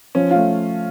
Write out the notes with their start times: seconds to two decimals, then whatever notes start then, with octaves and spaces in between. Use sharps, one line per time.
0.15 F3 C#4
0.31 A3 F4